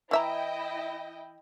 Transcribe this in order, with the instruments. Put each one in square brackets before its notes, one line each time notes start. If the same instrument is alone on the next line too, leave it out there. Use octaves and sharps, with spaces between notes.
[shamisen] E3 E5 A#5 [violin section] E4 D#5 G5